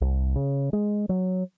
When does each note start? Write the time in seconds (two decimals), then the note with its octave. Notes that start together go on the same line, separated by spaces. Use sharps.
0.01 C2
0.36 C#3
0.73 G#3
1.09 F#3